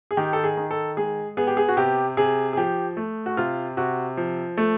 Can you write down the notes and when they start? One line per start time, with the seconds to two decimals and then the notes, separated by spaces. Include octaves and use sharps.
0.11 G#4
0.17 D#3 G4
0.33 A4
0.44 G#4
0.57 D#3
0.71 A4
0.97 G#3 G#4
1.37 B3 G#4
1.47 G4
1.57 G#4
1.69 F#4
1.77 C3 G4
2.17 C3 G#4
2.53 G#4
2.57 F3 G4
2.97 A3
3.26 F#4
3.37 C3 F4
3.77 C3 F#4
4.17 F3
4.57 A3